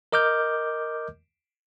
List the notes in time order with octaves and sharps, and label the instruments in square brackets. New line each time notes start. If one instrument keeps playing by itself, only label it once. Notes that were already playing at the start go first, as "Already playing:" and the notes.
[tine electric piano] A#4 D#5 D6 F6 G6